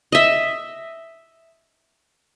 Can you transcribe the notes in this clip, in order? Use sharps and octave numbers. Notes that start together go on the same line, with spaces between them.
D#5 E5